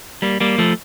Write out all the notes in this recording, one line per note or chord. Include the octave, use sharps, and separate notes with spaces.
G3 A#3
G3 A#3
F3 A3